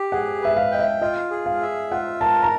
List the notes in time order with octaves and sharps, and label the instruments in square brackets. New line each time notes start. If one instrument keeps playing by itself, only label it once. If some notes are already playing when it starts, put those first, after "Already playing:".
Already playing: [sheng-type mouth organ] G4
[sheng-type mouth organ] G#4 [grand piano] F#5
[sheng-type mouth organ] B4 [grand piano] E5
[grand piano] F5
[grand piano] D#5 [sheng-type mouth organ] G5
[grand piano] E5
[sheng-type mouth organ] F4 [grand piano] D#5
[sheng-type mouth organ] G#4
[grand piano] F5
[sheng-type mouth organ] E5
[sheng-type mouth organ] F4 [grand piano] F#5
[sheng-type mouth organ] A#4 [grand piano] A5
[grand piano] A#5